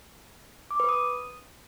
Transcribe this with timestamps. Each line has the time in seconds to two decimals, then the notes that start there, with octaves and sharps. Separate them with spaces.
0.71 D6
0.80 B4
0.89 D#6